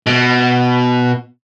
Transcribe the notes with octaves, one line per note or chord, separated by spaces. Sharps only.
B2